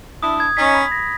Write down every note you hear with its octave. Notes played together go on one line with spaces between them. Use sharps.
D4 E4 D#6
G#6
C#4 D#4 B6
B5
A#6